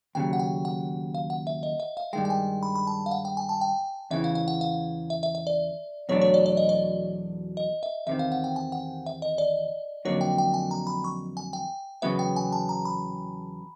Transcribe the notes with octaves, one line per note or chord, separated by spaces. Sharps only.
D#2 C#3 F#3 G5
F#5
G5
F#5
F5
F#5
E5
D#5
E5
F5
G2 D#3 G#3 G5
G5
G#5
B5
B5
A5
F5
F#5
G5
G#5
A5
G5
E2 C#3 E3 E5
F5
F5
F#5
F5
E5
E5
E5
D5
E2 B2 F#3 A3 D4 C#5
C#5
D5
D5
D#5
D5
D#5
E5
E2 C3 D#3 E5
F5
F#5
G5
G#5
F#5
E5
D#5
D5
F2 D3 F#3 A#3 D#4 C#5
G5
G5
G#5
A#5
B5
C#6
G#5
G5
E2 C#3 F#3 B3 E5
G5
G#5
A5
A#5
B5